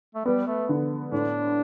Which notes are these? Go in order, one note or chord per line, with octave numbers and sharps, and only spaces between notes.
A3
G3 B3
A3
D3
A2 D4